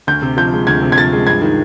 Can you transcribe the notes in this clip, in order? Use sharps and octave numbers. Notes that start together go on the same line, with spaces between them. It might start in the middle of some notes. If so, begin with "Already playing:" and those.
D2 G6
C3
F3 G6
G#3
D2 G#6
C3
G#6
F3 A6
G#3
G2 G#6
D#3